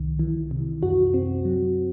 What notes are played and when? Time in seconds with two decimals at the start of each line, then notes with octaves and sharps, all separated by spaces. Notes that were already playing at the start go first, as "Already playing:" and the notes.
Already playing: C2 D#3
0.19 E3
0.51 C3
0.83 F#2 F#4
1.14 C4
1.45 F#3